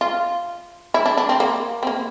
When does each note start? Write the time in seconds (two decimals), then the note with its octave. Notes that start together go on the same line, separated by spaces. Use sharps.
0.01 F4
0.94 E4
1.06 D4
1.17 D4
1.29 C4
1.40 A#3
1.83 C4
1.87 A#3